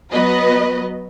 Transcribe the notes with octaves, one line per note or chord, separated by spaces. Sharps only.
F#3 B3 B4 D#5